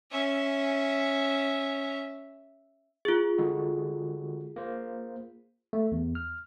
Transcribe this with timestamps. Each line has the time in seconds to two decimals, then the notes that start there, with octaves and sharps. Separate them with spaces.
0.11 C#4 E5
3.05 F4 G#4
3.38 D3 G#3 F#4
4.56 A#3 C5
5.73 A3
5.92 E2
6.15 F6